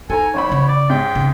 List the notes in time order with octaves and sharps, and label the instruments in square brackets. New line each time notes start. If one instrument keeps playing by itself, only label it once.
[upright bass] D#4 [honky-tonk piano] A4 C5 A#5 [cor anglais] G#5
[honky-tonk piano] A1 C5 B5 [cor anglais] C#5
[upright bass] C#3 F#3
[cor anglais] D5
[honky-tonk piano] G#2 C3 C#4 [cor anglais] G5
[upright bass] C#3 C4